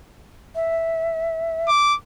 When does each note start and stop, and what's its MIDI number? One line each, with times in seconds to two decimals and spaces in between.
0.55 1.69 76
1.68 1.95 86